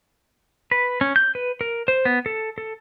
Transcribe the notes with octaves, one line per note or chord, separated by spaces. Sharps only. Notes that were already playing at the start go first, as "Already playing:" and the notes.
B4
C#4
G6
B4
A#4
C5
B3
A4
A4